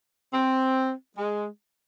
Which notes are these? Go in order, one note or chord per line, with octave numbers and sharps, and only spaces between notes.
C4
G#3